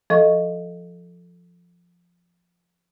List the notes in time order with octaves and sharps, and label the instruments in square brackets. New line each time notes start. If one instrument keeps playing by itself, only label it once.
[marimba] F3 A4 D#5 C#6